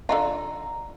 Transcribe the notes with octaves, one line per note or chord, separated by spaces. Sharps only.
D3 D#4 F4 A#5